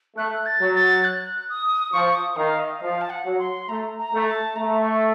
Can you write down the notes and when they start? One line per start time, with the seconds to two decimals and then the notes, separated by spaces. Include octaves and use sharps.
0.17 A3 F#6
0.46 A6
0.61 F#3
0.75 A6
1.04 F#6
1.50 D#6
1.93 F3 C#6
2.15 D#6
2.36 D#3 F5
2.59 D#5
2.80 F3 F5
3.01 A5
3.10 F#5
3.25 F#3
3.39 C6
3.69 A3 A#5
3.98 A#5
4.13 A3
4.27 A5
4.56 A3 A#5
4.79 C#6